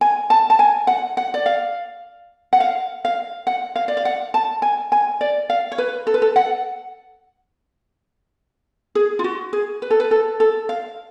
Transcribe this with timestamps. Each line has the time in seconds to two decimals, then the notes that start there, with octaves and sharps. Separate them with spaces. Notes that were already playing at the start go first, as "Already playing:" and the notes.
0.01 G#5
0.30 A5
0.50 A5
0.59 G#5
0.87 F#5
1.17 F#5
1.34 D5
1.46 F5
2.53 F#5
2.60 F5
3.05 F5
3.47 F#5
3.76 F5
3.88 D5
3.97 F5
4.05 F#5
4.34 A5
4.62 G#5
4.92 G#5
5.21 D5
5.50 F5
5.72 C#5
5.78 B4
6.07 A4
6.14 B4
6.22 A4
6.36 F#5
8.95 G#4
9.19 F4
9.24 F#4
9.53 G#4
9.82 B4
9.91 A4
10.00 B4
10.11 A4
10.40 A4
10.69 F5